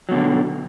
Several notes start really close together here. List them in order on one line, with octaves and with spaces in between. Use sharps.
F#3 B2 D3